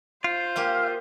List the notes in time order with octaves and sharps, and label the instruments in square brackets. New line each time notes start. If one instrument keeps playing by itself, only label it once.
[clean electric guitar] F4 [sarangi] C5
[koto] G#3 A#3 G4 [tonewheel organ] F5